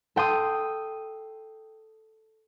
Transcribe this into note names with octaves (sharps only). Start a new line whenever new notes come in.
A4 G5 C6 D#6